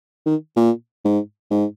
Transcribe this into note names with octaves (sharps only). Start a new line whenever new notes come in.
D#3
A#2
G#2
G#2